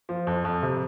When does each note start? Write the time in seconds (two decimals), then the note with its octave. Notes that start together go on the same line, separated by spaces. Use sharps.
0.09 F3
0.27 F2
0.45 F2
0.63 C3